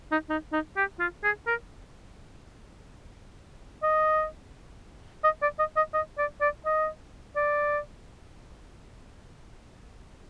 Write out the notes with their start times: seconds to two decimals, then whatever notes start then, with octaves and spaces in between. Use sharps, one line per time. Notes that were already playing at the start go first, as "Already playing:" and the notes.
0.12 D#4
0.29 D#4
0.52 D#4
0.76 G4
0.99 F4
1.23 G#4
1.47 A#4
3.83 D#5
5.24 D#5
5.42 D5
5.59 D#5
5.76 D#5
5.94 D#5
6.18 D5
6.41 D5
6.66 D#5
7.36 D5